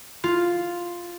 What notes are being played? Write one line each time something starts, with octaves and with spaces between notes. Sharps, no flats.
F4